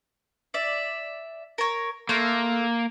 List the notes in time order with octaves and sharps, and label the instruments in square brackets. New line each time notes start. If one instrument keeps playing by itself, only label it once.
[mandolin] D5 E5
A#4 C#5
[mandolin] A3 F5 C6 [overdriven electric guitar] A#3